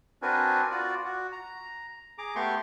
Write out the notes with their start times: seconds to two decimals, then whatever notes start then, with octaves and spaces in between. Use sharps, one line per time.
0.22 C4 D4 F#4 A#4 B4 G#5
0.71 F4 F#4 D5
1.04 F#4
1.33 A#5
2.18 G#4 A#5 D6
2.36 A3 B3 G4 C6 C#6